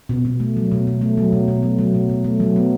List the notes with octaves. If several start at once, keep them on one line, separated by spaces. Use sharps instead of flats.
B2
B2
A3
F#3
B2
B2
A3
F#3
B2
B2
A3
F#3
B2
B2
A3
F#3
B3